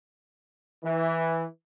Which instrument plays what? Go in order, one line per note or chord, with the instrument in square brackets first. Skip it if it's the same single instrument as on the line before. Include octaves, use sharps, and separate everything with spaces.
[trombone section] E3